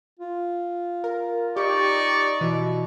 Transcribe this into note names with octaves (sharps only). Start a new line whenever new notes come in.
F4
A#4
D#4 G4 D5 C#6
B2 E3